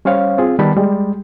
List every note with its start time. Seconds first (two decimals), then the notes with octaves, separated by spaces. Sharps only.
0.05 G3 C#4 C5 C#5 F5
0.38 C4 F4 G#4
0.59 D#3 G3 B3 A5 B5
0.77 G3 G#3